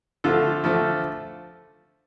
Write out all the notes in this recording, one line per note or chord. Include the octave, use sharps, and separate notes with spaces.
D3 F3 A3 F4 A4
D3 F3 A3